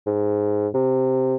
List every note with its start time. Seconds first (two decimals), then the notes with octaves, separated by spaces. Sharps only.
0.06 G#2
0.74 C3